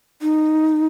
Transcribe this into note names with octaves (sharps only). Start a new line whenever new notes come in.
D#4